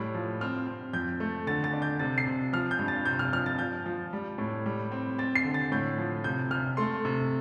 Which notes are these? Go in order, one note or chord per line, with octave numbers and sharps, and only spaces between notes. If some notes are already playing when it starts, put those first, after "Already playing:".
Already playing: A2 G3
F3
C4 F6
C4
F2 G6
A3
D3 A6
A6
D4
G6
C3 A6
C7
C3
F3 F6
G6
G2
A6
C3 G6
F6
F3 F6
A6
F3 G6
F3
G3
A2
G3
C4
C4 A6
C7
D3
A6
A2 G6
F3
C3 G6
C3 F6
A3 C6
C3